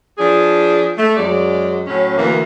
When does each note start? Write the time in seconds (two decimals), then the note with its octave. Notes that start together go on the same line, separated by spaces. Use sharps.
0.18 F3 D4 G#4
0.97 A3
1.17 F#2 F#3 G#3 D5
1.87 A2 F#3 C#4
2.17 D2 E3 A#3